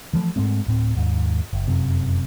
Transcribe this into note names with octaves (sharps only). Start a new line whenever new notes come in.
E3 F3 A3
G#2 G#3 A3 C4
D1 A2 C4
D#2 G#2
F#1
F1 F#2 C3